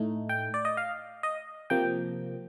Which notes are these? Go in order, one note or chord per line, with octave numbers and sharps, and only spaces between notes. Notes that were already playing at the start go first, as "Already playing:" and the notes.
Already playing: A2 A3 D#4
G5
D5
D#5
F5
D#5
C3 F3 A#3 G5